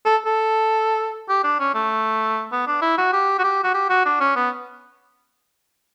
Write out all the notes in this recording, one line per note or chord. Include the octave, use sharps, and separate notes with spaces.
A4
A4
G4
D4
C#4
A3
B3
D4
E4
F#4
G4
F#4
G4
F#4
G4
F#4
D4
C#4
B3